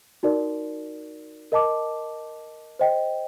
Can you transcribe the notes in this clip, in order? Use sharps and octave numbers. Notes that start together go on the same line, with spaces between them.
D#4 F#4 A#4 D5
A#4 D#5 A5 D6
C5 D#5 G5